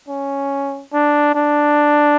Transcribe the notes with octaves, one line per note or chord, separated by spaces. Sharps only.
C#4
D4
D4